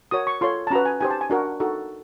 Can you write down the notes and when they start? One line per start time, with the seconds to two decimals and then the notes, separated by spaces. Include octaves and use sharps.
0.11 F#4 A#4 C#5 D#6
0.27 C#6
0.41 F4 A4 C#5 C6
0.67 A5
0.70 C#4 F#4 B4 A#5
0.85 G#5
1.00 D#4 G4 C5 G#5
1.10 A5
1.21 G#5
1.30 D4 F#4 A#4
1.60 D#4 F#4 A4